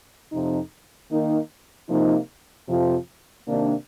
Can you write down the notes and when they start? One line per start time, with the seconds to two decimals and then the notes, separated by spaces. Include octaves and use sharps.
0.32 F2 C3 F3 C4 D#4
1.10 D#3 A#3 D#4
1.89 C3 F3 A#3 D#4
2.68 F2 C3 F3
3.47 C3 D#3 A#3 D4